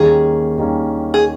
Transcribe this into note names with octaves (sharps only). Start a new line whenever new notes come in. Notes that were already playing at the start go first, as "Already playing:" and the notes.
Already playing: D#2 D#3 G3 A#3 C#4 G#4
D#2 D#3 G3 A#3 C#4
G#4